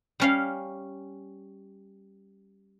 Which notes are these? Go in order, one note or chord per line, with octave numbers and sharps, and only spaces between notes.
G3 C#4 F5